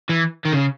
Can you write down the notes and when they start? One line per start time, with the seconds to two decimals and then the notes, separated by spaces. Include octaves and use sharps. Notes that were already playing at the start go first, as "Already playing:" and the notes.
0.09 E3
0.45 D#3
0.52 C#3